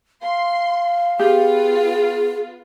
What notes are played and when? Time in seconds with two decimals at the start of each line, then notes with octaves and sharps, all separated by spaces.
0.22 F5 C6
1.19 B3 F4 G4 G#4